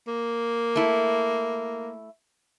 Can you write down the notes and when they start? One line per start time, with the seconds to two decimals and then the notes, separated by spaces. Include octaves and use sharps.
0.07 A#3
0.76 A3 E4